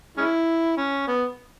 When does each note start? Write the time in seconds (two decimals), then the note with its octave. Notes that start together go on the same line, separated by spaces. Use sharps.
0.17 G#3 C#4 E4
0.77 C#4
1.08 B3